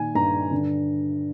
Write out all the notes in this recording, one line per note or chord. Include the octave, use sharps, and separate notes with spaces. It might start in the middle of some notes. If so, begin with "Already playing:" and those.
Already playing: A#2 D#3 G#5
G2 A#5
D3